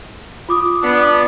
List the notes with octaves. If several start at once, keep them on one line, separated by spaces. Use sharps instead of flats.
F4 D6 D#6
B3 D4